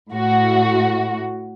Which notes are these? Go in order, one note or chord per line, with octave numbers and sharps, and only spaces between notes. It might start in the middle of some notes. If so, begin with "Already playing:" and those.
A2 F#4